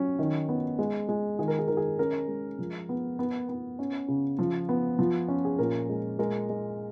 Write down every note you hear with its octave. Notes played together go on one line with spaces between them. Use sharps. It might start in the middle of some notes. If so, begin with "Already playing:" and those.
Already playing: F#3 C#4
D#3
B3
G#3
G#3
D#3 G#4
A#4
G#4
D#3 A#4
G#4
C#4 A#4
G#3
F3
B3
B3
B3
C#4
C#3
F3
B3
F3
C#4
G#4
A#2 A#4
G#3
G#3 A#4
G#3